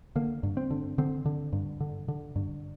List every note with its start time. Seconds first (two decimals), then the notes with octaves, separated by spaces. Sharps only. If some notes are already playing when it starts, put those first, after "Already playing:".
0.16 D3 A#3
0.43 G2
0.57 C4
0.71 D3
0.98 D3 C4
1.26 D3
1.53 G2
1.80 D3
2.08 D3
2.36 G2